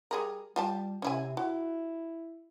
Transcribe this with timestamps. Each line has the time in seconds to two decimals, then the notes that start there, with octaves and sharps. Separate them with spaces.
0.11 G3 G#4 A#4
0.56 G3 F4 G4 A5
1.02 C3 C#4 E4 G#5
1.37 E4 F#4